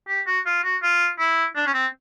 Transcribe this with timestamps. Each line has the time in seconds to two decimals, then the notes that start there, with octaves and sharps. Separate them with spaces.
0.08 G4
0.27 F#4
0.46 F4
0.63 F#4
0.82 F4
1.19 E4
1.55 D4
1.66 C#4
1.74 C4